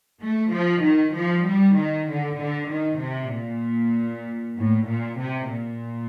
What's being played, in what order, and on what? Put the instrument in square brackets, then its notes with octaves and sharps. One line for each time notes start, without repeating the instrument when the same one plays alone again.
[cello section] A3
F3
D#3
F3
G3
D#3
D3
D3
D#3
C3
A#2
A2
A#2
C3
A#2